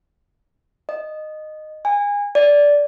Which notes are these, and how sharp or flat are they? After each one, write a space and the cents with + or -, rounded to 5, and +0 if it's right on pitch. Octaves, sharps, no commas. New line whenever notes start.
D#5 -15
G#5 -25
D5 -10